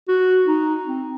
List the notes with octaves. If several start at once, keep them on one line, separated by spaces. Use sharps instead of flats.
F#4
D#4
C4